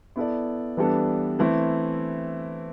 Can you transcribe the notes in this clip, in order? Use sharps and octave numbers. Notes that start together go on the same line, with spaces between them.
B3 E4 A4 D5
E3 G3 B3 D4 A4
E3 A3 C4 E4